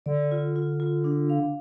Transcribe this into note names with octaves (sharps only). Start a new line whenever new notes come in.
D3 D5
F4
F4
F4
D4
F5